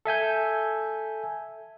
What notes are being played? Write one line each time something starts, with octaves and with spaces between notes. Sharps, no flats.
A4 E5 G#5 G6